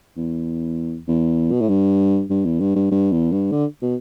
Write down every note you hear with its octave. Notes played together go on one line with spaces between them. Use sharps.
E2
E2
B2
A2
G2
G2
E2
G2
G2
G2
E2
G2
D3
B2